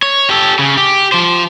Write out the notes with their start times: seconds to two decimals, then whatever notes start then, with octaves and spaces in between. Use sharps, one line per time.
0.02 C#5
0.30 G4 A4
0.59 C#3
0.77 G4
1.12 F3 C5